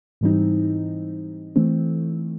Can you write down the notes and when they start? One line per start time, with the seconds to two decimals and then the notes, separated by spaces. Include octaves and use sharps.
0.21 G#2 E3 G3 C4 D#4
1.56 E3 A3 C4